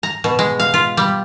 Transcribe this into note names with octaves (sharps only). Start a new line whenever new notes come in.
A#5
B2
G#3
F5
F4
G3